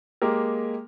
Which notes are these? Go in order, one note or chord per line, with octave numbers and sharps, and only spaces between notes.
G#3 A#3 G4 A#4